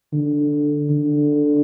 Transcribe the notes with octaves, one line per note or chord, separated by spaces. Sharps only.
D3
D3